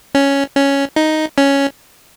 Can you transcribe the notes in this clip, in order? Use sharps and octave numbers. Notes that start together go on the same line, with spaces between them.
C#4
C#4
D#4
C#4